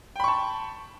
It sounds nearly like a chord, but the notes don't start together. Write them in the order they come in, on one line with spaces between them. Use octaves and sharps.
G5 B5 C#6 A5